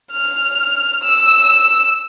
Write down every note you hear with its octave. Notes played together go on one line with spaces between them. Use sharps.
F6
E6